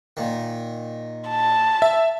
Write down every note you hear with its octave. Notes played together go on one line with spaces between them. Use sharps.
A#2 D#3
A5
E5